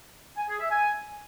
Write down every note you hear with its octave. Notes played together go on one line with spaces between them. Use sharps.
G#5
G#4
E5
G#5